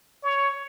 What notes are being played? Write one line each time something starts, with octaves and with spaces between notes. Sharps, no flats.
C#5